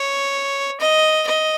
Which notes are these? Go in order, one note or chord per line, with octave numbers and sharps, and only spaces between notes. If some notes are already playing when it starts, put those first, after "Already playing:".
Already playing: C#5
D#5
D#5